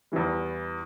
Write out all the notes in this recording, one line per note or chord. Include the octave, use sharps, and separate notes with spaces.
E2 E3 G3